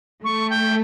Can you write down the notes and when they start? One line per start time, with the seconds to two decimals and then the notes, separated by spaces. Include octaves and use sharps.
0.24 A3 C#6
0.49 G5